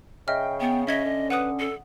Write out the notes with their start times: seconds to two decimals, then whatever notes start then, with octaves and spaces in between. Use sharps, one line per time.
0.28 C#3 D#5 E5 G5 F6
0.60 B3 G5
0.87 C#4 D#5 E5 G#6 B6
1.05 D3
1.30 B4 F#5 D#6
1.59 A4